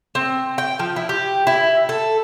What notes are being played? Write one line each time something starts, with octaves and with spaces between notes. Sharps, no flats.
C4
G5
F3
E4
G4
E4
A4